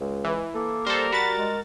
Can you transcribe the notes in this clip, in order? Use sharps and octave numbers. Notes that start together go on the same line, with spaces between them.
C#2 G#3
E3
A#3 A4
G3 A4 A#4 C5
F#4 B5 A6
G#3